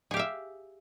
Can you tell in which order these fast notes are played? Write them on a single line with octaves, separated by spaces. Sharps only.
G#4 G4 F5 E5